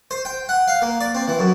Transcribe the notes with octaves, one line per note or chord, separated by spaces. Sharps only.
C5
G5
F#5
F5
A#3
D5
C4
E3
F#2